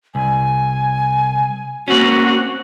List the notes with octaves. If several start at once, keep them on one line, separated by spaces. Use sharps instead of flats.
C2 G#5
A#3 C4 C#4 F#4